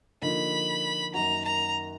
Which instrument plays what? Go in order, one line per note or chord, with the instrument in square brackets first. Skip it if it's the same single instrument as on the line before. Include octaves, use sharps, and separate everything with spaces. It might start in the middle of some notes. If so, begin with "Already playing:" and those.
[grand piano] D3 F3 A#3 D#4 [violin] B5
[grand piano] F#2 D#3 A#3 D#4 F#4 [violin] A#5
[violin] A#5